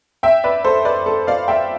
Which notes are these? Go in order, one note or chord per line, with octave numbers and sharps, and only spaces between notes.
E5 G5
B4 D5
A4 C5
B4 D5
A4
D5 F5
E5 G5